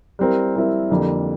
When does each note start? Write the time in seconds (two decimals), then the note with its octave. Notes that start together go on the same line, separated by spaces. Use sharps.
0.19 G3 C4 E4 A#4
0.55 G3 C4 E4 A#4
0.90 F2 D3 G3 A#3